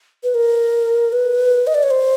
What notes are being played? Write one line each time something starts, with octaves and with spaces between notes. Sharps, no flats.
B4
A#4
B4
D#5
D5
C#5
C5